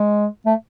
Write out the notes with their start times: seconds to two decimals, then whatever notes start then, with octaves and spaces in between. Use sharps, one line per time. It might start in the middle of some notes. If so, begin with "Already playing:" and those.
Already playing: G#3
0.46 A3